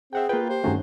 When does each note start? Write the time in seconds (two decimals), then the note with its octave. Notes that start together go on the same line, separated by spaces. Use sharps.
0.13 C4 G#4 E5 F#5 G5
0.29 A#3 F4 B4 G5
0.49 G4 C5
0.64 G2 D#3 A3 C#4 F#4 G#4